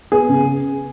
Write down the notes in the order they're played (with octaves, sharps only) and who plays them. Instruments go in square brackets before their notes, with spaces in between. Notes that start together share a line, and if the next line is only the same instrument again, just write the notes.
[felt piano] B3 [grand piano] G#4
[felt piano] C#3